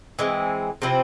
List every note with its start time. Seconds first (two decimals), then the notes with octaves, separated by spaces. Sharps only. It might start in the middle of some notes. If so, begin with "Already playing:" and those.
0.19 E3 G#3 C4
0.82 C3 F3 C4 E4